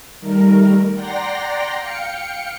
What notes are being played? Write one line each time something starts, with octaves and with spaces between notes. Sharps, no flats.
D#3 G3 A3 A#4
D5 F#5 G5 A#5 C6 A#6
F5 G5 C#7